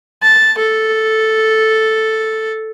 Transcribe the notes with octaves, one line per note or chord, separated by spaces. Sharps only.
A5
A4